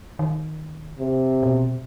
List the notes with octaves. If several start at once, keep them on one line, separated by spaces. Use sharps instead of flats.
D#3
C3
B2